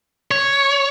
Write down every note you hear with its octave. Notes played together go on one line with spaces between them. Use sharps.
C#5